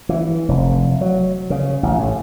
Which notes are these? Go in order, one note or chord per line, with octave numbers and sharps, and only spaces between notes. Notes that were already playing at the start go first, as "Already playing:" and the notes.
E3
F1
F#3
C#3
A1
A2